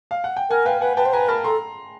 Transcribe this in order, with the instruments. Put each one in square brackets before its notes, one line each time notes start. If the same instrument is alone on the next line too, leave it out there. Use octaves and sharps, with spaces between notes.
[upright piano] F5
F#5
G5
[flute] A#4 [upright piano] F#5 G#5
[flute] B4 [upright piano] F5 G5
[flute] B4 [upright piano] F#5 G#5
[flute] B4 [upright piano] G5 A5
[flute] C5
[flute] B4 [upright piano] G#5 A#5
[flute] A#4 [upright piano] A5 B5
[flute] A4 [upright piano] A#5 C6